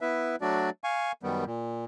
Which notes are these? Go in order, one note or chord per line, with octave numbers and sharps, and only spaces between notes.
B3 E4 B4 E5
F#3 A3 D4 F#4 D5
F5 G#5 C#6
F#2 D#3 G3 B3
A#2